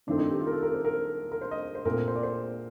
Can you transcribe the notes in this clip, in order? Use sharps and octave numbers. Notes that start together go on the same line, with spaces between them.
G2 D#3 A3 C4 D4
D#4
G4
F4
A#4
A4
A#4
C5
A#4
A#4
C5
D#5
C5
A#2 A3 C4 A#4
C5
D5
C5